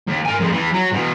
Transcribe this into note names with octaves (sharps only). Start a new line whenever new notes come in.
D#2
A#4 G#5
F2 G#3
E3 B3
F#3
B2 E3